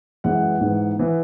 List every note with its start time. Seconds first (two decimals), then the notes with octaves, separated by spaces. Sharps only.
0.24 F#2 E3 G#3 B3 F#5
0.61 G#2 E3 B3
0.99 E3 B3